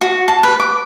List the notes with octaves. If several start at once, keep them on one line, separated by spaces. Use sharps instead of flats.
F#4
A5
B4
D6